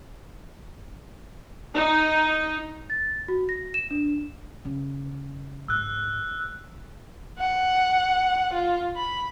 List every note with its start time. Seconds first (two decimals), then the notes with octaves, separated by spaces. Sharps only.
1.75 D#4
2.90 A6
3.28 F#4
3.49 A#6
3.74 E7
3.91 D4
4.65 C#3
5.68 G#2 E6 F#6
7.39 F#5
8.53 F4
8.96 B5